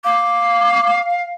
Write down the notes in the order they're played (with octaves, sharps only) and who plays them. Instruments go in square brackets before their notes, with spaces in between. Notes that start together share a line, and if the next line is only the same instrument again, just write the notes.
[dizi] F5 [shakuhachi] D6